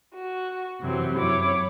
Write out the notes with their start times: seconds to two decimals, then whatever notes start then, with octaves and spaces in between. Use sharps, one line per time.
0.13 F#4
0.81 F#2 C3 E3 F#3 C4
1.18 F#2 E4 C#5 D6